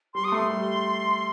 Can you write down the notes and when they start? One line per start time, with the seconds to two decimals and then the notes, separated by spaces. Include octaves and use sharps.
0.14 G3 C6
0.24 D#6
0.32 A3 C6
0.50 G3